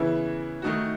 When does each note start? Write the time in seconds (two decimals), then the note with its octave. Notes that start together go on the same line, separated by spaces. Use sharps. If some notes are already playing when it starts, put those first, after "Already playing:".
Already playing: C#3 E3 B3 E4
0.62 D#3 A3 D#4 F#4